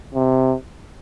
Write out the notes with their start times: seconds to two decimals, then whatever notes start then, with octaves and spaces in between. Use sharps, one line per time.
0.14 C3